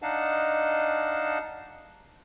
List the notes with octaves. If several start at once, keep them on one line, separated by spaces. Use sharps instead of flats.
D4 D#4 D#5 F5 F#5 A5